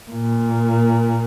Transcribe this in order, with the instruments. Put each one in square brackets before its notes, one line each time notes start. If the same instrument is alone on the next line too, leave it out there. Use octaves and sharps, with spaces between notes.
[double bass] A#2